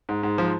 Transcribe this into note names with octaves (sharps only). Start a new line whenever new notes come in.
G#2
G#2
F3